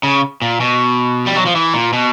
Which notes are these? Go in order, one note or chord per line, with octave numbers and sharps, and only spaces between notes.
C#3
A#2
B2
G3
F#3
F3
E3
A#2
B2